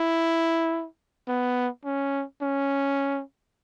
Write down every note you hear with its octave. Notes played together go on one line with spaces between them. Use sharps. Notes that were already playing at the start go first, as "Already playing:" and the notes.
Already playing: E4
B3
C#4
C#4